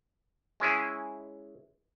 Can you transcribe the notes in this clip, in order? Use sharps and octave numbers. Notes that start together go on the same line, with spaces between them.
G#3 C#4 E4 G#4